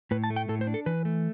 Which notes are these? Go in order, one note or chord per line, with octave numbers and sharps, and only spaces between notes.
A2 B4
A5
A3
G5
A2 A4
C5
D4
A4
E3 B4
A3